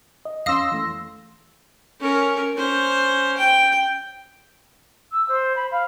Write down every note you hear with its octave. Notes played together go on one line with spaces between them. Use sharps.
D#5
F2 C#4 F5 C6 D#6 E6 A#6
E3 A3
C#4 A#4
C#4 C5
G5
E6
C5
B5
F5